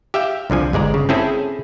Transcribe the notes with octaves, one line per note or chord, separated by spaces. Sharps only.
G4 E5 F5 G5
C2 D3 F3 G#5
G1 G#3 D5 A#5
C#3
C4 C#4 E4 G#4 A4